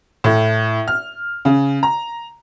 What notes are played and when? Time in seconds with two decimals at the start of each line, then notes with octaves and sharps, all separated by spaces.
0.24 A2
0.88 F6
1.45 C#3
1.83 A#5